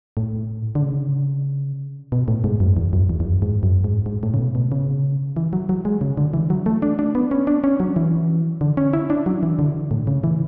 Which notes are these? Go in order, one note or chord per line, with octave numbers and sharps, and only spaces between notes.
A2
D3
C#3
B2
A2
G#2
F#2
E2
F#2
E2
E2
F#2
G#2
F#2
G#2
G#2
A2
C#3
B2
B2
C#3
E3
F#3
F#3
G#3
C#3
D3
E3
F#3
A3
D4
D4
B3
C#4
D4
C#4
F#3
E3
D3
C#4
E4
D4
F#3
E3
D3
A2
C#3
E3